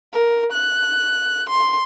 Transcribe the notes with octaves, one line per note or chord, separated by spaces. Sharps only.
A#4
F#6
C6